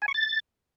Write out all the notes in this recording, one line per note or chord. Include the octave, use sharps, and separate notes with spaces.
G#5
C#6
A6